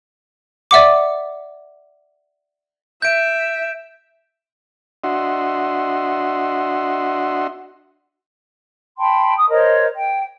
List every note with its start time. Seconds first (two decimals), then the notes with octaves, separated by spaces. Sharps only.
0.71 D5 E5 F#5 D6
3.02 E5 G6 D7
5.04 D4 F#4 D#5 E5 F#5 C6
8.98 G5 A5 B5 C6
9.36 D#6
9.50 A#4 C5 C#5 D#5
9.95 G5